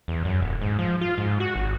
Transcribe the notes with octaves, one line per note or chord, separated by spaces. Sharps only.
E2
F#2
D#1
G#2
F3
F4
G#2
F#4
G#1